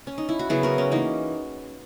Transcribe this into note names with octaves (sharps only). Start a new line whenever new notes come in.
C#4
D#4
E4
F#4
C#3 F#3 B3 E4 G#4
F#4 A#4
C#4
E3 A#3 C#4 D#4